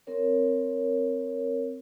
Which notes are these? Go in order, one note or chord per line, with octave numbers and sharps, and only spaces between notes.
C4 A#4 C#5